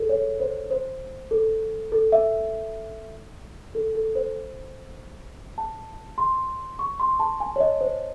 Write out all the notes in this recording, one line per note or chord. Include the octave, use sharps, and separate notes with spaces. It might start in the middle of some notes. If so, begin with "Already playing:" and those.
Already playing: G#4 A4
C#5
C5
C5
A4
A4
E5
A4
A4
C5
A5
C6
C#6
C6
A5
G#5
C#5
D#5
C5